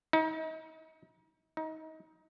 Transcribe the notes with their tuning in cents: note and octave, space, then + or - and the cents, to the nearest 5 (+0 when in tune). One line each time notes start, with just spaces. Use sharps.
D#4 +35
D#4 +25